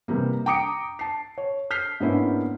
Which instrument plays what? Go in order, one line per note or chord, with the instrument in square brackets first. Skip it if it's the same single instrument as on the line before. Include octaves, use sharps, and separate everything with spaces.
[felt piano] C3 E3 G3 A#3
G5 A#5 D6 D#6 C#7 D7
A5 C7
C#5
F6 G6 B6 C7
G#2 A#3 B3 C#4 D4 E4